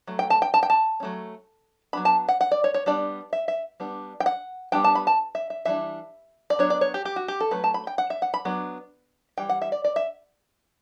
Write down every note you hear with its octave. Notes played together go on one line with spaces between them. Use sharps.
F#3 A3
G5
A5
G5
A5
G5
A5
F#3 A3 C#4
F#3 B3 D4 B5
A5
F#5
F#5
D5
C#5
C#5
G3 B3 D4 D5
E5
E5
G3 B3 D4
G5
F#5
G3 B3 D4 G5
A5
B5
A5
E5
E5
E3 G3 D4 E5
D5
F#3 B3 D4 C#5
D5
C#5
G4
G4
F#4
G4
A4
F#3 A3 C#4 B4
A5
B5
G5
F#5
E5
F#5
B5
F#3 B3 D4
E3 G3 G5
F#5
E5
D5
D5
E5